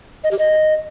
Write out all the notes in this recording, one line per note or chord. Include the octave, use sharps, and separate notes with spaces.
D#5
G4
D#5